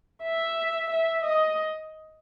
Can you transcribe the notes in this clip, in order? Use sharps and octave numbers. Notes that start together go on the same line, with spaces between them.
E5
E5
D#5